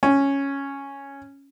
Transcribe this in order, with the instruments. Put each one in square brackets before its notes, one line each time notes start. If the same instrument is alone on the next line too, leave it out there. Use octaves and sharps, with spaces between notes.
[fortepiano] C#4